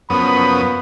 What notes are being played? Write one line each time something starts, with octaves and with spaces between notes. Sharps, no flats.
F#2 F3 A#3 B3 C#4 B5 D#6